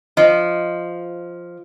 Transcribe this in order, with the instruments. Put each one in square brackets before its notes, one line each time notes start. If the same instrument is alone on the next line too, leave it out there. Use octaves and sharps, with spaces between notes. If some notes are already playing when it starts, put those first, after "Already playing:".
[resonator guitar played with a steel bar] F3 [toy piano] D#5